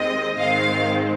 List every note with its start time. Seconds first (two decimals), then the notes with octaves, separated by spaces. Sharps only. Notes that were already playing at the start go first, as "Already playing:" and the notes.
Already playing: D#2 D#3 G#3 C4 D#5
0.39 G#2 D#3 G#3 C4 F5